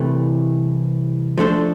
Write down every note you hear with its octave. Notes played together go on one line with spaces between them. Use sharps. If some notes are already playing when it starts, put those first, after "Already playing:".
Already playing: C2 C3 E3 A3
F3 A3 D4 A4 C5